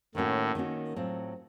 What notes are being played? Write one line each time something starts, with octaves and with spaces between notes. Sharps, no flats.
A2 D#3 A#3 C#4 F#4
D#3 A#3 C#4 F#4
A2 F#3 C4 F4